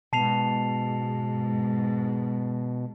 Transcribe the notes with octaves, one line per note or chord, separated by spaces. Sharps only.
G#2 B2 A5 C7 F7